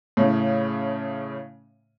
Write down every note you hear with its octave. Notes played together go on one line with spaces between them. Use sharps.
A2 C#3